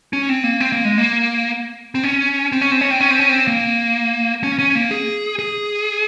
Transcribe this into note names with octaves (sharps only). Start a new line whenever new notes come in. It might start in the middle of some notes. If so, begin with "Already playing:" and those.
C#4
C4
A#3
C4
A#3
G#3
A#3
C4
C#4
C4
C#4
C4
C#4
C4
C#4
C4
C#4
C4
A#3
C#4
C#4
A#3
G#4
G#4